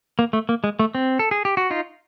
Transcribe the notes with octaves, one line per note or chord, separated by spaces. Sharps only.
A#3
A3
A#3
G#3
A3
C4
A4
G#4
G4
F#4
D#4 F4